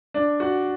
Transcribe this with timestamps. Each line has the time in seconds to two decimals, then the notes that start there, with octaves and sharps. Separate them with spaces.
0.14 D4
0.40 F#4